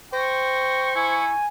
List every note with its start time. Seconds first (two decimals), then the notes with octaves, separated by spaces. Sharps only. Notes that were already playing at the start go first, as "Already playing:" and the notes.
0.13 C5 G5 C#6 A#6
0.96 E4 G#5